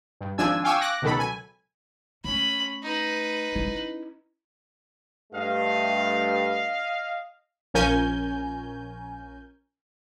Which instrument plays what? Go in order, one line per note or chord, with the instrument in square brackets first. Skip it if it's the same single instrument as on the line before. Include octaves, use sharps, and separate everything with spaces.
[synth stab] G2
G#1 F3 D4 G#5 E6 G#6
F5 G5 G#5 C#6 D6 E6
D6 F#6 A#6
C#2 B2 D#3 F#3 A4 B5
G#5
[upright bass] A3 [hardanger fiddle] C#4 B5
[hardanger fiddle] D#4 B4
[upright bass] C#4 E4
[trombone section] G2 A3 [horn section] D#5 F5
[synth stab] A#1 F3 C#4 A#4 G#5 G6